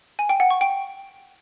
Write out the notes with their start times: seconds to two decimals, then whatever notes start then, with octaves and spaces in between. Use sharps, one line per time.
0.19 G#5
0.29 G5
0.40 F#5
0.50 C#6
0.61 G5